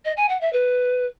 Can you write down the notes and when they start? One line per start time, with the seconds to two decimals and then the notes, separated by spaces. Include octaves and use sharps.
0.05 D#5
0.17 G#5
0.29 F#5
0.40 E5
0.52 B4